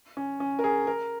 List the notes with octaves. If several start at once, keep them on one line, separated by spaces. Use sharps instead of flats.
C#4
C#4
A#4
G#4
A#4